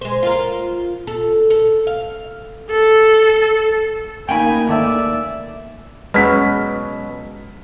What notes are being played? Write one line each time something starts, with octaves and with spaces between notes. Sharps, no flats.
G#3 C5
F4 A#4
A4
A4
F5
A4
D#2 A#3 C#4 D#4 G5 G#5 B5
G#2 D#3 A3 D5 E5
B2 F#3 G#3 C#4 G#4 B4 F6 B6